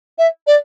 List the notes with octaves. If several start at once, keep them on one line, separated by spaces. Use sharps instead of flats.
E5
D5